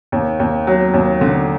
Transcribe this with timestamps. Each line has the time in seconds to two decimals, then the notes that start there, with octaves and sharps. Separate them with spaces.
0.12 D#2
0.40 D#2
0.67 F#3
0.94 D#2
1.21 D3